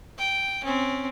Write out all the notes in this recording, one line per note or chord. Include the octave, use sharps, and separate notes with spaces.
G5
C4 C#4